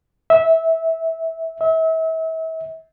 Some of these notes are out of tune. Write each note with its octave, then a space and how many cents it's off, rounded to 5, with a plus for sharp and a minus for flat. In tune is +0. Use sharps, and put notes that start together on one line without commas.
E5 -15
E5 -35